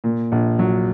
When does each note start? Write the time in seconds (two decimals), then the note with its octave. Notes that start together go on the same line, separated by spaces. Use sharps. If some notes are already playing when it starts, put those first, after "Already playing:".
0.04 A#2
0.32 A#1
0.59 F#3